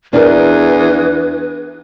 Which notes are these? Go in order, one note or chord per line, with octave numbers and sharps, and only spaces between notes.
E2 D4 A#4 B4